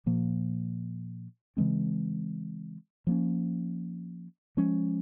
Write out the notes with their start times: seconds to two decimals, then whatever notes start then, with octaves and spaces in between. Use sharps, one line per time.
0.06 A#2 F3 A#3
1.57 C#3 E3 G#3 C4
3.07 F3 A#3 C#4
4.57 F3 G#3 C#4